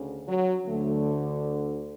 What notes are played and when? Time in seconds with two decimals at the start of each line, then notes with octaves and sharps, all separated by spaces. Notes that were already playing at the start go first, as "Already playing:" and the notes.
Already playing: D2 C#3
0.28 F#3
0.67 D2 D3 A3